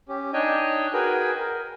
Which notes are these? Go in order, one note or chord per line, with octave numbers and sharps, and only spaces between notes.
C#4 G4
D4 D#4 C#5 D#5 G5 G#5
F#4 G#4 A#4 B4 G5 G#5
A#4